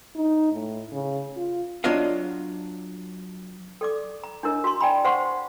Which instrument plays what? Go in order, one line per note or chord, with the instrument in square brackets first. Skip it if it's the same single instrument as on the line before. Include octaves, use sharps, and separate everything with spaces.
[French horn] D#4
A2
C#3
F4
[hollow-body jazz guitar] F#3 D4 F4 D#5 F5
[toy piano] A4 D5 D6
A#5
D4 E4 A#4 C#5 D#5
F#4 A#5 C6
D5 G5 G#5 A#5 B5
C5 F5 F#5 C6 C#6